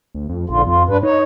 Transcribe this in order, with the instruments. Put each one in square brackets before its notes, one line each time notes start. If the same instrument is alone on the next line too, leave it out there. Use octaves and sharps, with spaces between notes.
[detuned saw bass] D2
F2
[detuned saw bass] A#1 [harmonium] G#2 D3 F4
[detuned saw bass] F2 [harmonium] F4
[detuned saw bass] G2 [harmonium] D4 B4
[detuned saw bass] D#4 [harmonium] C#5